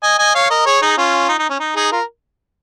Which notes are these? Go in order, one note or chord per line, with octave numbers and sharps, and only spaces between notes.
D#5 G#5
D#5 G#5
C#5 F5
A#4 D#5
G#4 C#5
D#4 G#4
C#4 F4
D#4
D#4
C#4
D#4
D#4 G#4
F4 A#4